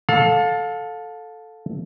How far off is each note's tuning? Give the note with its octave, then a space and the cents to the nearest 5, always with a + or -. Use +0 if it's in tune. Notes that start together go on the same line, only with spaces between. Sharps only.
A4 +0 F5 +30